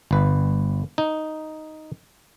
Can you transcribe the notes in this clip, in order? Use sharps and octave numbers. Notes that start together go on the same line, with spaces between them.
G1 B4
D#4